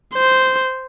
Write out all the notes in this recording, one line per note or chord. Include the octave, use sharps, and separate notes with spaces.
C5